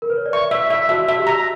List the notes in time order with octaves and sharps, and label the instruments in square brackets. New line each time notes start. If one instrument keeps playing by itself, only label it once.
[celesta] A#4
B4
C#5
D5
[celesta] E5 [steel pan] C#6
[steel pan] E5
E5
[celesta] F#4 [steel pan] E5
[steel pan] E5
[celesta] G4
[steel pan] A#5